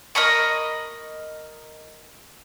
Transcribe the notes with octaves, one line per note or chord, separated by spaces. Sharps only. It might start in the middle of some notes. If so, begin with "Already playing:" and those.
A#4 D#5 B5 C#6